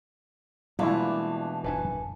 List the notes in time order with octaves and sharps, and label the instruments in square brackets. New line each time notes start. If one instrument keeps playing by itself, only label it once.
[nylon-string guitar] B2 E3 [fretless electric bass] G3 G#3 A#3 [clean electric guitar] D4 [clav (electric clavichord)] E4 F4
[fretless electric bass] D#1 F#2 D4 [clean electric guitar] B4 G#5 A5